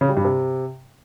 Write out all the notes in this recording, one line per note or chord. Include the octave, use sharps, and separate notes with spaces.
C#3
G3
G2
C3